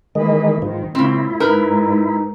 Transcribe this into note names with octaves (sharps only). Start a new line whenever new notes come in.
D#3 E3 G#3 A#3 B4
G#2 D#3 F3
A#2 C#3 G#3 C4 E4 F4
G#2 D#4 A#4 B4